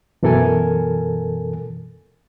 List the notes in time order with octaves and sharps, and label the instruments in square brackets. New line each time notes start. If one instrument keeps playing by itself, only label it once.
[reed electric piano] F#2 B2 E3 A4 A#4 G#5